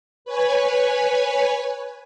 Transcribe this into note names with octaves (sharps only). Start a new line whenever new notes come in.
B4 C#5 G#5